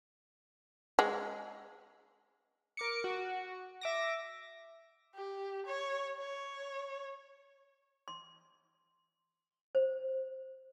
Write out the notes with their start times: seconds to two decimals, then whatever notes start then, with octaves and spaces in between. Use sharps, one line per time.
0.99 G#3
2.77 A#4 D6 C#7
3.04 F#4
3.81 E5 D6 A#6
5.15 G4
5.66 C#5
6.18 C#5
8.08 C6
9.75 C5